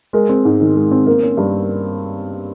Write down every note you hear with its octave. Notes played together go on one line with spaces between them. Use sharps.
G#3 A#4
C4
G#2
D#3
G#3
C4
A#3 A#4
C#4
G2